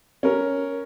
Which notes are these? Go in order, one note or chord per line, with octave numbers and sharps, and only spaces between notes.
C#4 A#4